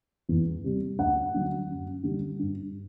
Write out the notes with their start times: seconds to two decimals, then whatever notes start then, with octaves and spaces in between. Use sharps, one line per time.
0.29 E2
0.64 C3 G3
0.98 D2 F#5
1.34 D3 F#3
1.69 F#2
2.03 D3 G3
2.39 G2